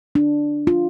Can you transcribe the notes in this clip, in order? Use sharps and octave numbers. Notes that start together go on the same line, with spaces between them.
D4
F4